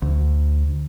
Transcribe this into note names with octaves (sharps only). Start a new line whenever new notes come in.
D2